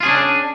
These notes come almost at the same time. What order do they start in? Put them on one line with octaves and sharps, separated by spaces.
F4 G#4 C#4 D4